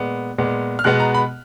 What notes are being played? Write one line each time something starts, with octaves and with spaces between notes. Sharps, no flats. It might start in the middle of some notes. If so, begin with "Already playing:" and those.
Already playing: A#2 G#3 B3
A#2 G#3 B3
F6
B2 G#3 B3 F#6
A#5
B5